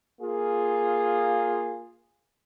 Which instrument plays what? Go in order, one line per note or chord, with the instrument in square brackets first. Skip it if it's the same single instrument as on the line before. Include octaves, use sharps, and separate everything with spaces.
[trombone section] A#3 F4 G#4